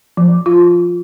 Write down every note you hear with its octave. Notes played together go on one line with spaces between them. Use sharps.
F3
F4